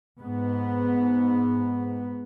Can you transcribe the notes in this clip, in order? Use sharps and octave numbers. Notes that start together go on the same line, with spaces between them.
G#2 B3